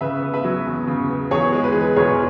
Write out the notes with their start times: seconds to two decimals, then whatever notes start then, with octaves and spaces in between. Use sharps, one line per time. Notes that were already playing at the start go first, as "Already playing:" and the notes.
0.01 C#3 B4 E5
0.22 B3
0.34 B4 E5
0.44 F#3
0.66 E2
0.87 C#3
1.10 B3
1.31 E2 G#4 C#5
1.53 G#3
1.64 B4
1.72 E3 G#4
1.81 B4
1.96 E1 G#4 C#5